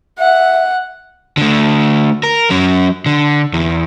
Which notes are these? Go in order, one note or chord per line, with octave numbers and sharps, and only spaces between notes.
E5 F#5
D3 A3
A#4
F#3 C#4
D3
E2